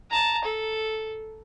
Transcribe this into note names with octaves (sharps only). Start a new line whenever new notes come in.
A5 A#5
A4